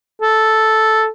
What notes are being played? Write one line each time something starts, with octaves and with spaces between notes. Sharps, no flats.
A4